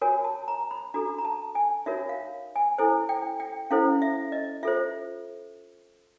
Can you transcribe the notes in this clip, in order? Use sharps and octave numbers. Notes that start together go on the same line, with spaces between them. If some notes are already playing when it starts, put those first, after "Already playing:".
F#4 A#4 C#5 G#5
A5
A#5
B5
D4 F#4 A4 A#5
A#5
A5
G#5
D#4 F#4 A#4 C#5 E5
F5
G#5
E4 A4 C5 G#5
G5
G5
C#4 E4 A4 C5 F5
E5
D#5
F4 A4 C5 E5